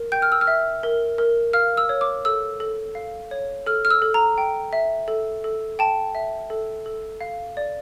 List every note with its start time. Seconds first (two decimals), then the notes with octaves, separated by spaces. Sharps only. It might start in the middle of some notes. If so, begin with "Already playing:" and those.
Already playing: A#4
0.12 G5 G6
0.22 F6
0.32 E6
0.41 F6
0.47 E5
0.83 A#4
1.18 A#4
1.53 F5 F6
1.77 E6
1.89 C#5
2.01 D6
2.25 A4 E6
2.60 A4
2.95 F5
3.31 C#5
3.66 A4 F6
3.85 F6
3.91 E6
4.02 A4
4.14 A#5
4.38 G5
4.73 E5
5.08 A4
5.44 A4
5.79 G5 A5
6.15 E5
6.50 A4
6.86 A4
7.21 F5
7.57 D5